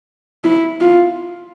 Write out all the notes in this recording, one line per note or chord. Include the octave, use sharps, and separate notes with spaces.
E4
F4